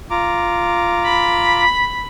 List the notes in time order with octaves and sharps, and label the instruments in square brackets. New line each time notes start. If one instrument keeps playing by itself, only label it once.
[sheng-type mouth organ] F4 A#5 D6
[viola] B5